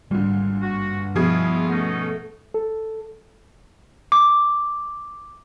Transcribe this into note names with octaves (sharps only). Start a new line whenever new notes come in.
G#1 A#2 D3 G3
G2 F#4
B2 F3 E4 F4 G#4 G#6
A3 B3 C#4 D#4
A4
D6